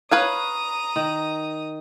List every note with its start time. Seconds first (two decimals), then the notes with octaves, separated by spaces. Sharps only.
0.11 B4 C#5 F5 A#5 D#6
0.96 D#3